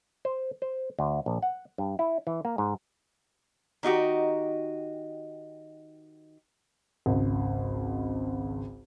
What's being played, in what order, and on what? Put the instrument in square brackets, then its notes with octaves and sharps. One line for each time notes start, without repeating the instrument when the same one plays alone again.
[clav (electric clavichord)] C5
C5
D2
A#1
F#5
G2
E4
E3
A#3
G#2
[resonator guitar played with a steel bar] D#3 D#4 F#4 G4
[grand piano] G#1 C#2